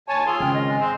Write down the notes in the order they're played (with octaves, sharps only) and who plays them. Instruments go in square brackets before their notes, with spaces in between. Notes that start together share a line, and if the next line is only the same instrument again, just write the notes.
[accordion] D#2 G#5 A5 [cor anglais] C#5
[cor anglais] F4 [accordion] G#4 [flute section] A5 E6
[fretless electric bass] G#1 C#3 [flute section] G5 F6
[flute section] D#5
[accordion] G#3
[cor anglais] C4